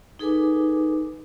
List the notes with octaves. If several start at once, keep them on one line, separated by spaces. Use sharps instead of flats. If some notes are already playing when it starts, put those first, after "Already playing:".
D#4 G#4 A4 B4 G#5 D6